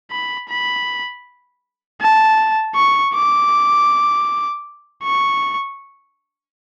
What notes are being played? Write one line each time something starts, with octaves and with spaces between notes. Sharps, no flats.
B5
B5
A5
C#6
D6
C#6